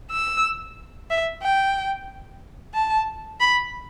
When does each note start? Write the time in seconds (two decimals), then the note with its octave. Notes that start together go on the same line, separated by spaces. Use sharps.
0.11 E6
1.10 E5
1.42 G5
2.74 A5
3.40 B5